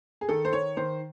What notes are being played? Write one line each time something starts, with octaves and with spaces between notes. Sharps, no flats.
G#4
D#3 A4
C5
D#3 C#5
D#3 C5